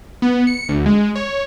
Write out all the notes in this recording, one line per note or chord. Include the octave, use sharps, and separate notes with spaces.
B3
C#7
D2
G#3
C#5